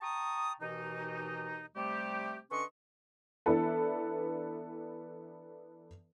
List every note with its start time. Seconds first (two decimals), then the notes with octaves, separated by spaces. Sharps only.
0.02 G5 A5 A#5 C#6 D#6
0.61 D#2 B2 E3 D#4
1.76 C3 G3 A3 G4
2.50 D3 C#4 B4 D#5 C6 C#6
3.46 E3 B3 D4 E4 A4 B4